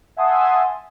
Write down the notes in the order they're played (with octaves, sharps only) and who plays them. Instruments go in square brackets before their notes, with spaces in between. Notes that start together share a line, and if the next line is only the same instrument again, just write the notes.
[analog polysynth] E5 F#5 G#5 A5 C6 D#6